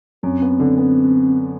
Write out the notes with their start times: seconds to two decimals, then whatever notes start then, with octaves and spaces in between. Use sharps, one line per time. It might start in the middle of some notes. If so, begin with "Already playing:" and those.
0.23 F#2 C4
0.42 B3
0.60 D3
0.78 B3